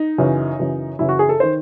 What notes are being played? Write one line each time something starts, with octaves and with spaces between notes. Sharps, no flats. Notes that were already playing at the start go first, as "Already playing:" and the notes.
Already playing: D#4
F#2 C#3 E3
F#2 C#3 E3
F#2 C#3 E3 E4
F#4
G#4
A4
D#3 C5